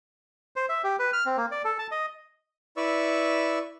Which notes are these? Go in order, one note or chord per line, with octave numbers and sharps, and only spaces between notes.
C5
E5
G4
B4
F6
C4
A#3
D5
A4
A5
D#5
E4 B4 D5 C#6 E6